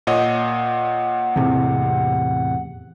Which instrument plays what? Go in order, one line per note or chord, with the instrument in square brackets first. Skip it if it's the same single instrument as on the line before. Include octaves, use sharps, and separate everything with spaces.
[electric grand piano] A#2 C#5 D#5 [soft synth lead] F#5
[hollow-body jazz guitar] E2 A2 C3